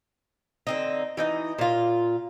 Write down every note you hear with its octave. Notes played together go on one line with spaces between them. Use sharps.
D3 C4 D#4
E3 D#4 D#5
A#2 F4